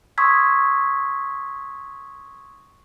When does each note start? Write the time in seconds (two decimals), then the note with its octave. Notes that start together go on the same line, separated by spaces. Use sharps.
0.18 C6 C#6 D#6 E6 G#6 B6